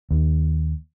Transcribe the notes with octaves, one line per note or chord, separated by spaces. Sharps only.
D#2